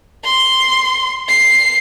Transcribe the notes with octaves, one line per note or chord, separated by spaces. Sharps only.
C6
C7